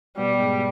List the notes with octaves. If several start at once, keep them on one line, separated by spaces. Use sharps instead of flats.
B2 G3 B3
G#2 G#3